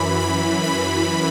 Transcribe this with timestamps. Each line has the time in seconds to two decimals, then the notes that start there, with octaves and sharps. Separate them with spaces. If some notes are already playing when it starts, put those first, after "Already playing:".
Already playing: F#2 E3 B5
0.20 B5
0.64 B5